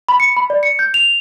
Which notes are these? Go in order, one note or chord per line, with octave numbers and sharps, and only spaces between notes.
B5
C#7
B5
D5
C#7
G6
F7